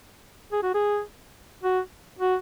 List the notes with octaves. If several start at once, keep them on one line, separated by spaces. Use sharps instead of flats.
G#4
F#4
G#4
F#4
F#4